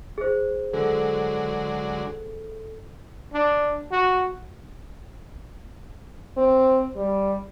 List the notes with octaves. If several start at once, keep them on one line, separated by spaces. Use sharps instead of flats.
G#4 C5
D3 F#3 G#3 A4
D4
F#4
C4
G3